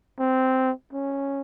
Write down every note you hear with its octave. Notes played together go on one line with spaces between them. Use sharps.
C4
C#4